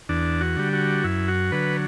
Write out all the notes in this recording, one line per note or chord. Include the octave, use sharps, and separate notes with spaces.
E2 D4
F#4
D3 G3
F#4
F#2 E4
F#4
D3 F#3 B4